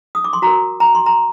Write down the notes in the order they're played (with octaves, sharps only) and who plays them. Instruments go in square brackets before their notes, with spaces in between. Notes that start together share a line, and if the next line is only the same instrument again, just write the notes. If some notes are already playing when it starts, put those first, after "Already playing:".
[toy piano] D#6
D6
C6
F#4 A#4 A#5
A#5
C6
A#5